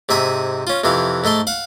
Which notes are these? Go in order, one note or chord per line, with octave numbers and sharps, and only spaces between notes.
G#2 C3 E5 G#5 D#6
C#4 F4
F2 C3 E3 F5
G#2 A3 A4 C6
F5 F#5